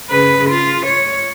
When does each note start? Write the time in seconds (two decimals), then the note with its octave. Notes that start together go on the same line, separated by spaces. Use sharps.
0.10 C#3 B4
0.49 F4
0.86 C#5